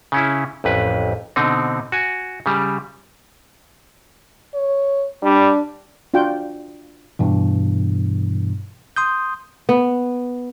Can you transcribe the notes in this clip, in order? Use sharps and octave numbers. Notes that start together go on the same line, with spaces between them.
C#3 C#4 E4
A1 F2 B4
B2 D3 C4 D#4
F#4 G#5
C#3 G3
C#5
G3 D4
D4 F4 F#4 G5
G2 B2 E3
C6 D#6 G6
B3